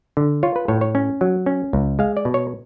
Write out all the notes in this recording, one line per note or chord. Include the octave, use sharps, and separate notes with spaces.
D3
F4 C#5
B4
A2 C#5
C#5
C#4
F#3
C#4
C#2
G#3 F5
D5
B2
C#5